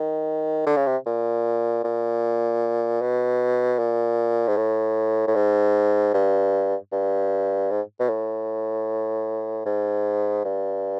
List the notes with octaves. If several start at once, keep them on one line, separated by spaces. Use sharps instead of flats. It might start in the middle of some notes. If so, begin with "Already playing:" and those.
Already playing: D#3
D3
C#3
C3
A#2
A#2
B2
A#2
G#2
A2
A2
G#2
G2
G2
G#2
B2
A2
G#2
G2